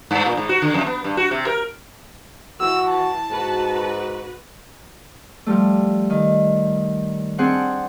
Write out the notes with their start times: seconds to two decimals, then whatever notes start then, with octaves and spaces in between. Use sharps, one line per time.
0.11 G2
0.26 A#2
0.37 G#2
0.49 F#4
0.62 D3
0.74 F2
0.86 B3
1.04 G2
1.17 F#4
1.31 C3
1.46 A#4
2.61 E3 F#4 E6
2.90 A5
3.31 G#2 F#4 B4
5.46 F3 G3 A3
6.10 D#3
7.38 C4 D4 G#4 C5 F#5